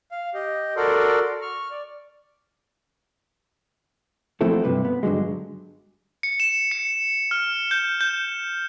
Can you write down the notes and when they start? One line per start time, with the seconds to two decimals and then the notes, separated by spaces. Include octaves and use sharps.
0.11 F5
0.34 G4 D#5
0.77 F#4 A4 A#4 D5 C6
1.42 C#6 F6
1.71 D5
4.41 F3 F#3 A3 C4 E4 A4
4.64 G2 C3 B4
4.85 B3
5.03 G2 D3 F#3 G#3
6.23 C#7
6.40 E7
6.71 C#7
7.31 F6
7.71 G6
8.01 G6